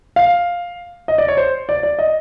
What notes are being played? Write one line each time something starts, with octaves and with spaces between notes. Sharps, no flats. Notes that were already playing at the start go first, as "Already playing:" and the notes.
F5
D#5
D5
C#5
C5
D5
D5
D#5